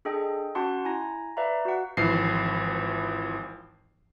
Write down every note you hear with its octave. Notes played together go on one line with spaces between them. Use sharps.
D4 G#4 A4 D#5 G5
C#4 F#4 F#5 A5 C6
E4 G#5 A#5 A#6
B4 D5 E5 F5 A#5
F#4 F#5
G#1 E3 F3 C7